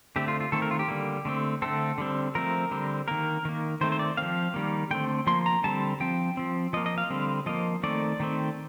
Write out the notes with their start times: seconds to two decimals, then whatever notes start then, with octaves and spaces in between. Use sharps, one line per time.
0.16 D3 A3 C4 G4
0.28 F4
0.40 F4
0.52 D#3 A3 C4 A4
0.62 A#4
0.71 F4
0.79 G4
0.88 D3 G3 A#3
1.25 D3 A3 C4
1.62 D3 A3 C4 A4
1.98 D3 G3 C4
2.35 F3 A3 C4 A#4
2.71 D3 G3 C4
3.08 D#3 A#3 A#4
3.45 D#3 A#3
3.81 D#3 A3 C4 C5
3.92 C5
3.99 D5
4.17 F3 C4 F5
4.54 D#3 G3 A#3
4.91 D3 A3 C4 G5
5.27 F3 A#3 C6
5.46 A#5
5.64 D3 G3 C4 A5
6.00 F3 C4 G5
6.37 F3 C4
6.73 F3 D#5
6.77 A#3
6.86 D#5
6.98 F5
7.10 D3 G3 C4
7.46 F3 A#3 D#5
7.83 D#3 A3 C4 D5
8.20 D#3 A3 C4